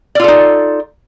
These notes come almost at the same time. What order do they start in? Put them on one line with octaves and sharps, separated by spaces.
D5 F4 A4 D#4